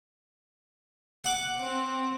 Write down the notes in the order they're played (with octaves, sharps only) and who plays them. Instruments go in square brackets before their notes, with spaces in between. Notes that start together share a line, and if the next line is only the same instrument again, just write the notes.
[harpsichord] F#5 D6
[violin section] C4